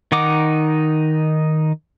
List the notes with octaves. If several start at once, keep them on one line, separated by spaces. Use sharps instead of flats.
D#3 D#4 F#5 D6